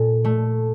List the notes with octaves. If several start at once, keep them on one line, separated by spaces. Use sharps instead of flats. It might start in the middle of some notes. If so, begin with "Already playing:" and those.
Already playing: A#2 A4
A3